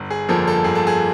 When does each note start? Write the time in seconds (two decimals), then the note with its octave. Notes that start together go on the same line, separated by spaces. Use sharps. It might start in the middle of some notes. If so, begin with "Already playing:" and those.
Already playing: G1
0.10 G#4
0.29 F2 D3 F3 A#3 A4
0.47 A4
0.64 G1 G#4
0.75 A4
0.87 G#4